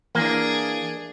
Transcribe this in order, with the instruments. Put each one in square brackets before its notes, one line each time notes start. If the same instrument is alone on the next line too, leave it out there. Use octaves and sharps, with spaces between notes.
[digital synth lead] E3 [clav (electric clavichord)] A#3 [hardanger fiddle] D4 G#4